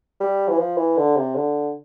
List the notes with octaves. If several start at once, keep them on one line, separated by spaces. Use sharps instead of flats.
G3
E3
F3
E3
D3
C3
D3